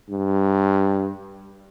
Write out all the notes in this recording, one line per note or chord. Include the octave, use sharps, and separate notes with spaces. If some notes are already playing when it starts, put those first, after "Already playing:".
G2